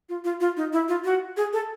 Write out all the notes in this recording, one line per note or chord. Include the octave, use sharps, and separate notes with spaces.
F4
F4
F4
D#4
E4
F4
F#4
G#4
A4